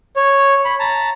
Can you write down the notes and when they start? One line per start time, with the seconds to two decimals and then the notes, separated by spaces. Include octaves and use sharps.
0.16 C#5
0.65 B5
0.79 A5 A#5